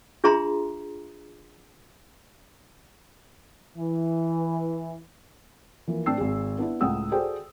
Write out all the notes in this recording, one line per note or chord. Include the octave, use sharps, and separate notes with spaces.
D4 F4 G#4 E5 A#5 C6
E3
E3 F3 A#3
A2 C4 D4 G5 E6 C7
G#1 G#4
B3 D4 E4
C#2 A2 F#5 G5 D#6 E6
F#4 G#4 A4 C5 D5 G5